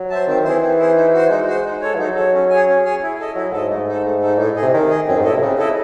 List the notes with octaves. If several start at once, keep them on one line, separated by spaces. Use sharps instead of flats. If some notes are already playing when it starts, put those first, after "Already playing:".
Already playing: F#3
C5 E5 A5
D#3 C4
E3 E4 G#4 C5
C4
E4 G#4 C5
D#4
F#4 C5
G#3 D#4
F#4 C5
D#4
A4 C#5
E3
F#3 D#4
A4 C#5
C#4
G#4 C#5 G#5
C#4
G#4 C#5 G#5
E4
A4 D#5
F#3 E4
G#2 A4 D#5
G#2 A3
D#4 A4
A3
D#4 A4
A2 D#4
G#4 D#5
C3
D#3 D#4
G#4 D#5
F#2 C4
G#2
A2 E4 A4 D#5
C3
C#3 C4
E4 A4 D#5